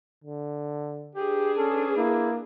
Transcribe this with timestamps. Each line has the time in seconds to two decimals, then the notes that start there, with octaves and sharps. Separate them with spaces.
0.24 D3
1.15 D4 G4 G#4 B4
1.57 C#4 A4
1.97 A#3 E4